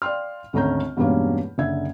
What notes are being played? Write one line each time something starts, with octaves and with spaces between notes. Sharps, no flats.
D5 F5 G5 C6 F6
G#1 D2 A3 C#4 A#5 G6
E2 G2 B2 G#3 A#3 C#4
F#1 D3 E5 G#6